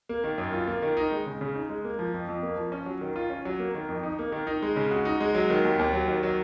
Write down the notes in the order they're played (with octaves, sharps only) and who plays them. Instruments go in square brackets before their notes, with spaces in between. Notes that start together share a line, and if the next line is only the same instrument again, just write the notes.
[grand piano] A#3
D#3
F#2
F4
A#3
D#3
D#4
G#3
C#3
C#3
D#4
G#3
A#3
F3
F2
F2
A#3
F3
C#4
F#3
D#3
F4
C#4
F#3
A#3
D#3
F2
D#4
A#3
D#3
D#4
G#3
C#3
F#4
D#4
G#3
F#3
D#3
D#2
D#2
F#3
D#3
F#3